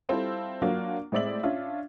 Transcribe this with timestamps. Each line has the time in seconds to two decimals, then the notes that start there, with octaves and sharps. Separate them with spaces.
0.09 G3 C4 E4 F4 A4 C5
0.62 F#3 A#3 D4 F4 F#4
1.12 A2 G#3 C4 D5 E5 F#7
1.43 C#4 D4 F4 E5